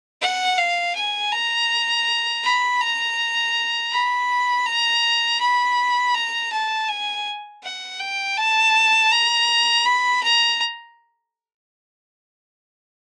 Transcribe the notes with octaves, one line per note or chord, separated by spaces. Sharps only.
F#5
F5
G#5
A#5
B5
A#5
B5
A#5
B5
A#5
A5
G#5
F#5
G5
A5
A#5
B5
A#5